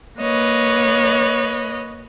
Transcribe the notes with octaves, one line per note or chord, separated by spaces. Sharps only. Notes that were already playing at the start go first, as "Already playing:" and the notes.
A#3 B4 C#5 D#5